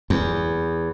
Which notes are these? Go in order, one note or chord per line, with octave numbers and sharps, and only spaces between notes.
E2